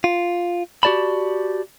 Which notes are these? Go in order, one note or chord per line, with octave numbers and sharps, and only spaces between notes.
F4
F#4 G4 D5 A5 B5